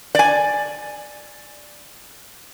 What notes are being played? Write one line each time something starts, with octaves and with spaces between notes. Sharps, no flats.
D5 G#5